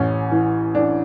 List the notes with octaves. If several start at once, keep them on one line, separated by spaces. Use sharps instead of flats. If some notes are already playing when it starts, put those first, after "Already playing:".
Already playing: A1 C#4
E3
E3 D4